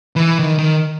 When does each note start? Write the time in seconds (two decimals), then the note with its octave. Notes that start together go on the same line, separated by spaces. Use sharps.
0.16 E3
0.39 D#3
0.58 D#3